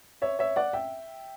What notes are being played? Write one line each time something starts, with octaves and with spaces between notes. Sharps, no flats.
C#5 E5
C#5 E5
D5 F#5
E5 G5